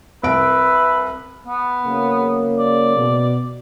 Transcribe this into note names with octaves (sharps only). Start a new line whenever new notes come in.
C2 B4 E5 D7
B3
C#3 F#3 A#3
D5
B2